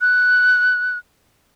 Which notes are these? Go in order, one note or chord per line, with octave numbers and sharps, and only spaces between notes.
F#6